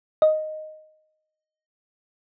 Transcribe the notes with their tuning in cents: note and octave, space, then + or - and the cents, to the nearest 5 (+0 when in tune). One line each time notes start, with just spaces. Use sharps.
D#5 -5